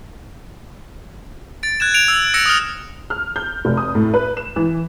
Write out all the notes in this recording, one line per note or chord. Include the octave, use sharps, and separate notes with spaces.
A6 D7
F#6 G#6 E7
D7 F7
E6
E6 A#6 C#7 D7 E7
D#6 F6
F6
G6
F1
D#6
A2
B4
E7
E3